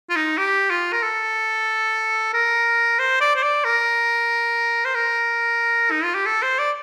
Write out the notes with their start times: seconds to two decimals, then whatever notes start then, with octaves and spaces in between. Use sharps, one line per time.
0.09 F4
0.16 D#4
0.38 G4
0.70 F4
0.93 A#4
1.03 A4
2.34 A#4
2.99 C5
3.21 D5
3.36 C5
3.43 D5
3.64 A#4
4.85 C5
4.95 A#4
5.91 D#4
6.03 F4
6.15 G4
6.26 A4
6.42 C5
6.59 D5